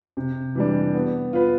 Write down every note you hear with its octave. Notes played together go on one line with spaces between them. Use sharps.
C3
E3 G3 D4
B3
F4 B4